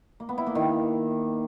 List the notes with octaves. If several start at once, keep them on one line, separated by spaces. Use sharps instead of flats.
A#3
B3
E4
A#3
D#3